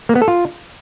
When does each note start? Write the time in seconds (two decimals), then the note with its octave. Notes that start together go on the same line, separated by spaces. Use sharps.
0.09 A#3
0.15 B3
0.22 A4
0.28 F4